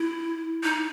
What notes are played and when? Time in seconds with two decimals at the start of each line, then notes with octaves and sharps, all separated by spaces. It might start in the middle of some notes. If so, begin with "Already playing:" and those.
Already playing: E4
0.64 D#4